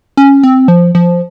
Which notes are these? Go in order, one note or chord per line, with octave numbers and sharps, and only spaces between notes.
C#4
C4
F3
F3